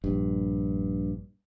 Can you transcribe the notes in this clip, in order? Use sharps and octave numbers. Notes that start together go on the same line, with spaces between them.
A#1 G2